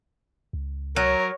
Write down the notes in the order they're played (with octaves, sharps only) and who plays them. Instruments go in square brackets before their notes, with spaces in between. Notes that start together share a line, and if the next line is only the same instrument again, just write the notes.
[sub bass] C#2
[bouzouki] F#3 [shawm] A#4 [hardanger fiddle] C#5